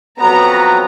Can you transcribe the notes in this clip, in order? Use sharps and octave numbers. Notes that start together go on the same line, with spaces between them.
F2 F#3 B3 A#5